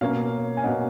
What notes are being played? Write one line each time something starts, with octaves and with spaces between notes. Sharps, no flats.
B2 A#3 C#4 C#5 F5
G#5
B2 A#3 C#4 D#5 F#5